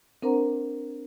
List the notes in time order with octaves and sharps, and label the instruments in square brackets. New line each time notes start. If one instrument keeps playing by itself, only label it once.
[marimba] C4 D4 A#4 C5 F#5 A#5